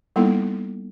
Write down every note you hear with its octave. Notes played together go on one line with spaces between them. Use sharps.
G3 A#3 B3 D#4 E4 A4